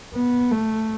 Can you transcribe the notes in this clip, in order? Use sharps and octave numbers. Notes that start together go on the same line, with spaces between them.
B3
A3